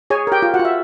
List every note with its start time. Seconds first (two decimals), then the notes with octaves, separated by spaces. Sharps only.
0.10 G#4 C#5 G#5
0.27 G4 A#4 G5
0.42 F4
0.54 F#4 F#5
0.60 F4
0.65 E5